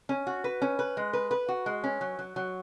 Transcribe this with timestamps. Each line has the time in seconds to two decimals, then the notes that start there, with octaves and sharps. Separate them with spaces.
0.09 C#4
0.27 F#4
0.44 B4
0.62 C#4
0.79 B4
0.97 G#3
1.13 B4
1.31 B4
1.48 F#4
1.66 G#3
1.84 C#4
2.01 F#3
2.19 F#3
2.36 F#3